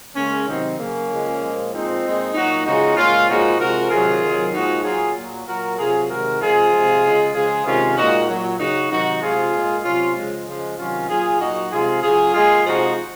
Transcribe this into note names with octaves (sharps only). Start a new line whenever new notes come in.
C#3 G#3 A#3 C#4
C3 D#3 F#3 C4 D#4
C#3 F#3 A#3 C#4
C#3 F3 G#3
A#2 F3 G#3
A#2 F3 G#3 C4 D#4
A#2 G#3
A#2 F#3 D#4 F#4
C#3 F3 G#3 D#4 F#4
A#2 G#3 C#4 F4
A#2 F3 G#3 D#4 F#4
C3 F3 G#3 F#4 A#4
C3 D#3 F#3 F4 G#4
C3 D#3 F#3
A#2 F3 G#3 D#4 F#4
A#2 F#3 F4 G#4
A#2 F#3
A#2 F#3 F#4 A#4
C3 F#3 F4 G#4
C3 D#3 G#3 F#4 A#4
C3 F3 G#3 F4 G#4
C3 F3 G#3
C#3 G#3
C#3 F3 G#3 F4 G#4
C3 D#3 G#3 C#4 F4
A#2 G#3 D#4 F#4
A#2 F#3
C#3 F#3 D#4 F#4
C3 D#3 F#3 D#4 F#4
C3 F3 G#3 F4 G#4
A#2 G#3
C3 F#3 C#4 F4
C#3 F3 G#3
C#3 F3 G#3
C3 D#3 F#3 C#4 F4
A#2 F#3 F4 G#4
A#2 F#3 D#4 F#4
C3 F3 G#3 F4 G#4
C#3 F#3 F4 G#4
A#2 G#3 F4 G#4
C3 F3 G#3 D#4 F#4